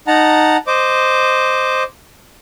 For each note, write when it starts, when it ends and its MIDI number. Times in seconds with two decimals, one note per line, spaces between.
0.07 0.57 63
0.07 0.57 78
0.07 0.57 81
0.07 0.57 82
0.67 1.83 72
0.67 1.83 75
0.67 1.83 86